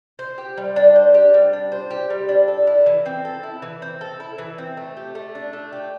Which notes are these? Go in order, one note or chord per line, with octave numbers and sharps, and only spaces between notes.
C5
G4
G3
D4
C5
G4
G3
D4
C5
G4
G3
D4
A4
E4
E3
C4
A4
E4
E3
C4
A4
E4
E3
C4
A3
G4
A3
D4
A3
G4